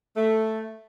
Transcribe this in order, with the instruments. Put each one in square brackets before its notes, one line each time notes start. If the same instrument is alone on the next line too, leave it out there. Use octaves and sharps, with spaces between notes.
[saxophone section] A3